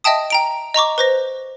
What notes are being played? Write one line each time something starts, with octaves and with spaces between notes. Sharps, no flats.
D#5 E5 G5 A5 D#6
G5 A#5 D7
D#5 A#5 C#6 D6
B4 C5 A#6